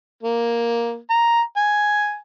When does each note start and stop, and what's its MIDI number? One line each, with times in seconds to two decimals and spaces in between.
0.23 0.97 58
1.10 1.41 82
1.57 2.16 80